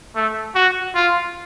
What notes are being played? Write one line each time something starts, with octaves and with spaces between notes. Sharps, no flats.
A3
F#4
F4